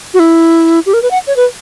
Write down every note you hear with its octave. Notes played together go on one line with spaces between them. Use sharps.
F#4
E4
G4
A#4
B4
F#5
C#5
B4